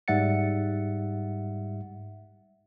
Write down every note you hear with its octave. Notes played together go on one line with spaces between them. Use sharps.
G#2 G3 E5 F#5 A6 C#7